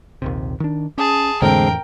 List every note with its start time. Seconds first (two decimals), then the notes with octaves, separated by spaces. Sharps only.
0.22 A#1 D#2 C3
0.60 D#3 D4
0.98 C#4 G#4 A5
1.42 F2 A2 D3 E3 G#3 C4 A#4 G5